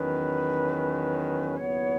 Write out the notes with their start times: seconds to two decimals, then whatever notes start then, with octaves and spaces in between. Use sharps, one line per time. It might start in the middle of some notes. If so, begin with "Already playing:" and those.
Already playing: E2 D#3 F#3 C#4 B4
1.57 D#2 C#3 F#3 B3 E4 C#5